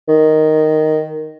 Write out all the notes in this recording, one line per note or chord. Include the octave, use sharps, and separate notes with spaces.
D#3